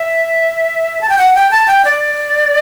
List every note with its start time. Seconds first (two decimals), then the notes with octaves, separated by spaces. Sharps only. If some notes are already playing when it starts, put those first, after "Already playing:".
Already playing: E5
1.01 A5
1.09 G5
1.18 F#5
1.35 G5
1.51 A5
1.68 G5
1.85 D5